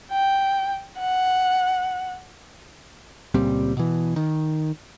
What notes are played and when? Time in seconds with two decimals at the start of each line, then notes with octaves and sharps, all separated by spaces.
0.12 G5
1.00 F#5
3.34 C#2 A#2 G3 C4
3.77 B2 E3
4.16 D#3